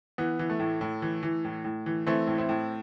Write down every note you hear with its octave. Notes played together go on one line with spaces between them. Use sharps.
E3 B3
E3
A3
A2
A2
E3
E3
A2
A2
E3
E3 A3 C4
A2
C4 E4
A2